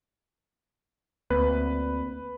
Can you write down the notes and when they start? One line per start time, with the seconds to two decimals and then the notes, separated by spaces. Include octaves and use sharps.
1.30 D2 A#3 C4 B4